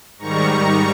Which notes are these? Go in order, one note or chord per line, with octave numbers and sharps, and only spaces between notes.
G#2 D#3 G3 A#5 C#6